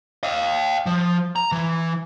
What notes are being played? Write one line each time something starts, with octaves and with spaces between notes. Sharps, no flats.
D#5 F5
F3
A#5
E3